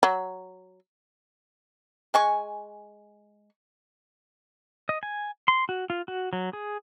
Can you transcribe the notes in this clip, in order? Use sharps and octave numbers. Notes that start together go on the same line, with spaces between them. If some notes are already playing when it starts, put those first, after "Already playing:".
F#3
G#3 G#5 C#6
D#5
G#5
C6
F#4
F4
F#4
F#3
G#4